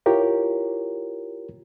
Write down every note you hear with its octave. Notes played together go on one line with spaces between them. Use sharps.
E4 F4 G4 A#4 C#5